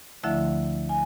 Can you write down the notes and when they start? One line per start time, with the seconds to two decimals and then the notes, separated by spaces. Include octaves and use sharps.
0.23 D2 D3 F3 A3 E4 E5
0.89 G#5